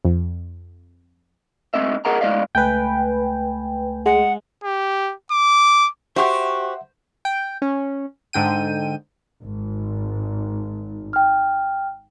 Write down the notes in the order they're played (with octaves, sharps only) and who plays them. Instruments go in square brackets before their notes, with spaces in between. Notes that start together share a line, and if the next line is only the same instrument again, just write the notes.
[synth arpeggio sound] F2
[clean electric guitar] G#2 C4 D#5 E5
G#4 A#4 D#5 F#5 A#5
A2 G#3 D5 D#5 F5
[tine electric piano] C#2 A3 G#5 [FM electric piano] B4 G5
[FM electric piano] G#3 [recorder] F#5
[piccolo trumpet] G4
D6
[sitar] F#4 G4 [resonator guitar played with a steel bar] C5 [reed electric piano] E5 F#5 [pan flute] C#6
[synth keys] G5
C#4
G#2 D3 G5 D#7
[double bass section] G#1
[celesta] G5 F6